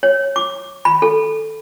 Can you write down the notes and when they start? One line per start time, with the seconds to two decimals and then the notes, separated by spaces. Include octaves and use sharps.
0.03 C#5
0.36 D6
0.85 B5
1.02 A4